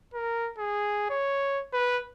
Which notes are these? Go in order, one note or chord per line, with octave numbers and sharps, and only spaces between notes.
A#4
G#4
C#5
B4